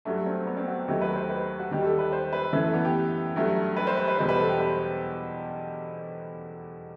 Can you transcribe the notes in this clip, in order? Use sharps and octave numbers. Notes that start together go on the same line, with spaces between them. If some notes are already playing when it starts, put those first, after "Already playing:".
G2 F#3 A3
C4
B3
C4
F#4
G4
D#2 D#3 F#3 A3 G4
B4
C5
B4
F#4
D#2 D#3 G3 G4
A4
B4
C5
B4
F#2 E3 A3 B4
A4
B3
G4
G2 F#3 A3
B4
C5
B4
B4
E2 B2 G3 C5
B4
A4
G4
B4
C5